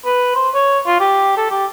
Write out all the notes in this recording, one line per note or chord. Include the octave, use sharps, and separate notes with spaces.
B4
C5
C#5
F4
G4
A4
G4